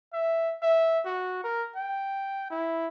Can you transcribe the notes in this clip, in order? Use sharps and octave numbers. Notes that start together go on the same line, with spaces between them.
E5
E5
F#4
A#4
G5
E4